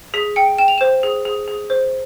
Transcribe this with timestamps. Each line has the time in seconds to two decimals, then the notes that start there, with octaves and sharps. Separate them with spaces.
0.14 G#4 B6
0.36 G5 C#7
0.58 G5 E7
0.68 F7
0.78 C5 E7
1.03 G#4
1.25 G#4
1.48 G#4
1.70 C5